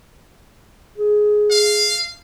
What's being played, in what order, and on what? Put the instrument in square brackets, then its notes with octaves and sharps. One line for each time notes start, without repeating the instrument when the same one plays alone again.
[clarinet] G#4
[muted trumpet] F5